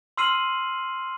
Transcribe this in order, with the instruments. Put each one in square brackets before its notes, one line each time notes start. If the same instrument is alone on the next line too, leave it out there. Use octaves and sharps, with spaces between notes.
[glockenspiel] C6 E6 F6 C7 D#7 F#7